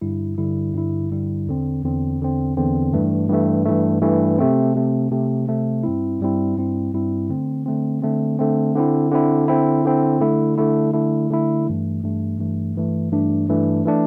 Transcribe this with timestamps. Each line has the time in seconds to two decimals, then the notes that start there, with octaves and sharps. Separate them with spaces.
0.01 G2 D3 G3 E4
0.38 G2 D3 G3 E4
0.74 G2 D3 G3 E4
1.11 G2 D3 G3 E4
1.47 E2 D3 C4
1.84 E2 D3 C4
2.20 E2 D3 C4
2.57 E2 D3 C4
2.93 G2 E3 A3
3.29 G2 E3 A3
3.66 G2 E3 A3
4.02 G2 E3 A3
4.38 C3 A3 C4
4.75 C3 A3 C4
5.11 C3 A3 C4
5.48 C3 A3 C4
5.84 G2 G3 C4 E4
6.20 G2 G3 C4 E4
6.57 G2 G3 C4 E4
6.93 G2 G3 C4 E4
7.29 D3 A3 C4
7.66 D3 A3 C4
8.02 D3 A3 C4
8.39 D3 A3 C4
8.75 D3 C4 E4
9.11 D3 C4 E4
9.48 D3 C4 E4
9.85 D3 C4 E4
10.21 D3 A3 E4
10.58 D3 A3 E4
10.93 D3 A3 E4
11.30 D3 A3 E4
11.66 G2 E3 A3
12.03 G2 E3 A3
12.39 G2 E3 A3
12.76 G2 E3 A3
13.12 G2 E3 A3 D4
13.48 G2 E3 A3 D4
13.85 E3 A3 D4